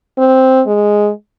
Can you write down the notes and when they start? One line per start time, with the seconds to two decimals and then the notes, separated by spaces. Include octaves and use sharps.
0.18 C4
0.67 G#3